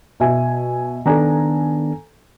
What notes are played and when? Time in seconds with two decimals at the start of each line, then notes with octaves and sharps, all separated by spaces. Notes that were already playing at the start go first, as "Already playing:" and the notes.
0.20 B2 E5 G#5
1.06 D#3 B3 D4 A4 G#5 A#5